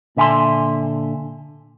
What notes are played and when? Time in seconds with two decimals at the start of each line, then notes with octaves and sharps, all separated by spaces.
0.17 A#2 D3 E5 G#5 A5 C6